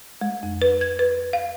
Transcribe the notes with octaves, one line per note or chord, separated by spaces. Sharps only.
G#3
F2
B4
G#6
B4
F5